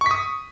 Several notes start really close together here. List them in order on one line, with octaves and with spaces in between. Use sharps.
C#6 B6 D#6